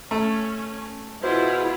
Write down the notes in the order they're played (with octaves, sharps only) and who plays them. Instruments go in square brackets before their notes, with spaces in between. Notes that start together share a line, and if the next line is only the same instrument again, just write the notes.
[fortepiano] A3 A4 [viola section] C#4
[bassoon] B2 [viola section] E4 F4 G#4 [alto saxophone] C5